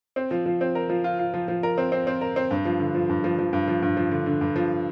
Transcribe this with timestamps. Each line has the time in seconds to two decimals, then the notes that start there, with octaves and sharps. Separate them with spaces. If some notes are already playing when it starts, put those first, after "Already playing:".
0.16 C4
0.31 F3
0.46 F3
0.61 C4
0.75 A#4
0.90 F3
1.04 F4
1.19 F4
1.34 F3
1.48 F3
1.63 A#4
1.78 C4
1.92 C4
2.07 C4
2.21 A#4
2.36 C4
2.51 G2
2.65 F3
2.80 D3
2.95 F3
3.09 G2
3.24 F3
3.39 F3
3.53 G2
3.68 F3
3.82 G2
3.97 F3
4.11 D3
4.26 D3
4.41 G2
4.56 F3